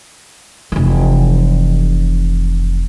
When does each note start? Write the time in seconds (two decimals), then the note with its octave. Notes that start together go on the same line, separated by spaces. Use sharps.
0.72 F1 E3